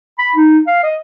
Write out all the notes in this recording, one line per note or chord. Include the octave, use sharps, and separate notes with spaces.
B5
D#4
F5
D#5